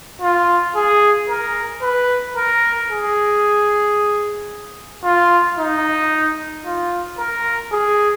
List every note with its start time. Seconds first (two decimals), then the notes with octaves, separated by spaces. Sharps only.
0.21 F4
0.76 G#4
1.29 A#4
1.82 B4
2.37 A#4
2.90 G#4
5.04 F4
5.58 D#4
6.65 F4
7.19 A#4
7.72 G#4